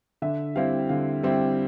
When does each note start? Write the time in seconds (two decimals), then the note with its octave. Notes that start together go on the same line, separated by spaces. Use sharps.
0.22 D3 E5
0.56 G3 C4 E4 F5
0.89 D3 F5
1.23 G3 C4 E4